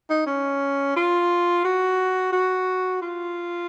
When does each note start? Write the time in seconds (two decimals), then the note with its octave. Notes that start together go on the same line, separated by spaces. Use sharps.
0.10 D#4
0.27 C#4
0.96 F4
1.65 F#4
2.32 F#4
3.02 F4